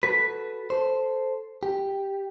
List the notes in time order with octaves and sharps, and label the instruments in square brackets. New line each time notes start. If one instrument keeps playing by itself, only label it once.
[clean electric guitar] F#4 A4 B4 [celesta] B6
[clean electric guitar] A4 C5
G4